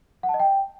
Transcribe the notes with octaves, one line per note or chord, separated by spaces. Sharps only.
F#5
A5
D#5
G5